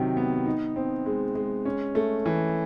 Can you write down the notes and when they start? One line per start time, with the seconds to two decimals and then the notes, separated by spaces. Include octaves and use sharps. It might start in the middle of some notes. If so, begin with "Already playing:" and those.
Already playing: C3 D#3 F#3
0.17 B3
0.46 D#4
0.76 C4
1.06 G#3
1.35 G#3
1.65 C#4
1.95 A3
2.26 E3